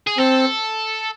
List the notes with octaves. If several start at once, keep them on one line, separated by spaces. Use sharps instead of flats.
G#4
C4 A4